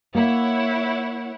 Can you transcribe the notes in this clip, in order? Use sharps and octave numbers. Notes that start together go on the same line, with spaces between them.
A#3 E4 C#5 F#5